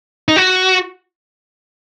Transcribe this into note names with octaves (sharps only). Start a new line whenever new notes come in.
D#4
F#4